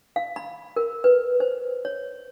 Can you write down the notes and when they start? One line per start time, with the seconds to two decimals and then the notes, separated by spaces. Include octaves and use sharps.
0.16 F5
0.36 B5
0.76 A#4
1.04 B4
1.40 C5
1.85 C#5